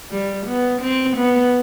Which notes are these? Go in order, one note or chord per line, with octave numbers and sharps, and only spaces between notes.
G3
B3
C4
B3